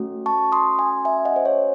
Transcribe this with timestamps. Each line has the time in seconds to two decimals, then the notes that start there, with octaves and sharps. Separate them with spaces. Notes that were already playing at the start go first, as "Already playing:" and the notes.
Already playing: A3 C#4 F#4
0.26 A5 C#6
0.52 C6 D#6
0.79 G#5 C6
1.05 E5 G#5
1.25 D#5 F#5
1.36 C5
1.45 C#5